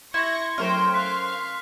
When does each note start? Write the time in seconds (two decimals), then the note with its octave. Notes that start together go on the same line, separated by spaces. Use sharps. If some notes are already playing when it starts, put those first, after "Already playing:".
0.14 E4 C6 C#6 G#6 A#6
0.58 F#3 A3 C#4 A#4 C5 G5 F6
0.94 F5 F#6 B6